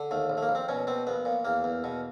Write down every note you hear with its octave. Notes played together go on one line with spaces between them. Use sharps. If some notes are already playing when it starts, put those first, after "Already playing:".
Already playing: D3
D#2 A3
A#1
A3
A#3
A#1
C4
B2 C#4
B2 C4
A#1 B3
A#2
E2 A#3
E2
B2